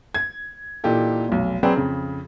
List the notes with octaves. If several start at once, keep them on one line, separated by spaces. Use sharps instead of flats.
G#6
A#2 E3 D#4 G4 A4
F1 B1
F#3 C4 F#4 G#4 B4 D5
F2 C#3